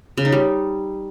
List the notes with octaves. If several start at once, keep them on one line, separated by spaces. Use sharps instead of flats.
C#3
D#4
G3